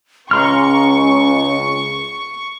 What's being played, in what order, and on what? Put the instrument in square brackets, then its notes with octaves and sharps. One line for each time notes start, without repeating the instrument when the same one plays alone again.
[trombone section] C#2 [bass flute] C#4 [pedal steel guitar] A#5 C6 F6 [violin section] C#6